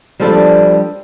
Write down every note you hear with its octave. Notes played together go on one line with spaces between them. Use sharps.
F3 G3 B3 D4 A4